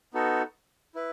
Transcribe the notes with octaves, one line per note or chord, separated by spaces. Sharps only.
B3 D#4 F#4 A4
E4 B4